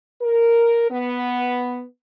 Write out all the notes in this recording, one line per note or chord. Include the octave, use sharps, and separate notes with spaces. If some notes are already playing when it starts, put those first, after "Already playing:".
A#4
B3